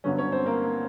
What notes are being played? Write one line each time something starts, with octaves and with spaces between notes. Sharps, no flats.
G2 D3 F#3 B3 C#4 C#5
C#4 C#5
C4 C5
A#3 A#4